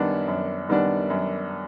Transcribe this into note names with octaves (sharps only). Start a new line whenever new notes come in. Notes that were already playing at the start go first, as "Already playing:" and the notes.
Already playing: F#2 D#3 G3 B3 D4
F#2
D#3 G3 B3 D4
F#2